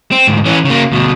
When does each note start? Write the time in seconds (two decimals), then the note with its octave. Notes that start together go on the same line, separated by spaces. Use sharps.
0.12 C4
0.27 D2 G#2
0.45 E3 C#4
0.65 C#3 A#3
0.91 D2 B2